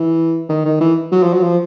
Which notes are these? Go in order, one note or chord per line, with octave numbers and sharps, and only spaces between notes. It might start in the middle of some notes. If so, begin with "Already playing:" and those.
Already playing: E3
D#3
D#3
E3
F#3
F3
F#3
F3